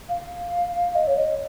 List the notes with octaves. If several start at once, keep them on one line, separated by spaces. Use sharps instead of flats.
F5
D#5
C#5
D#5